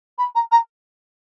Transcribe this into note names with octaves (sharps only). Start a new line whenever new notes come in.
B5
A#5
A#5